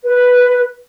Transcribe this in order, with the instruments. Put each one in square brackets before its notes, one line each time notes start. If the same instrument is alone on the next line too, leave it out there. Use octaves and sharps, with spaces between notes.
[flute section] B4